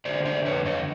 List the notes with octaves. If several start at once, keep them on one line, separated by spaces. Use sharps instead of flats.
D3 C5 D5
C5 D5
F2 B4 C#5
C#5 D#5